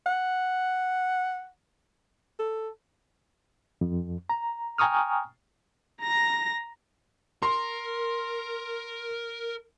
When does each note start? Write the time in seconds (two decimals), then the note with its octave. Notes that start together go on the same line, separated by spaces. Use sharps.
0.06 F#5
2.39 A4
3.81 F2
4.30 A#5
4.78 G5 G#5 A#5 C#6 D#6 F6
6.02 A#5 A#6
7.42 A#4 C6